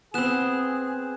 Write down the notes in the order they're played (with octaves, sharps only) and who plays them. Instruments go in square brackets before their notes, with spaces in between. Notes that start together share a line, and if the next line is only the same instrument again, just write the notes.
[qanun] B3 C4 [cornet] G#4 [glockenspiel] F#6 E7